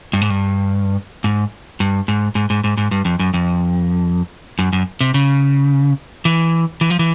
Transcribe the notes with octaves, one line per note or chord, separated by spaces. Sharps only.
G2
G#2
G2
G#2
G2
G#2
G#2
G#2
G#2
G#2
G2
F2
F#2
F2
F#2
F#2
C3
C#3
E3
E3
F3
E3